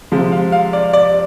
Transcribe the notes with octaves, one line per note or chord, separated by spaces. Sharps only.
C3 F3 G#3
F5
F5
D5
D5